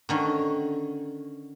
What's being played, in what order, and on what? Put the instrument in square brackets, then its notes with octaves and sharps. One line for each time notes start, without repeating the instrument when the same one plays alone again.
[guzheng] D3 D#3 C#4